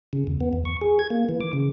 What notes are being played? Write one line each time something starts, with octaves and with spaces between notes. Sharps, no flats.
C#3
E2
B3
E2
C#6
G#4
G#6
A#3
E3
D6
C#3